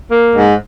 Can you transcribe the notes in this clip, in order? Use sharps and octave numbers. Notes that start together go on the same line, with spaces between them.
A#3
G#2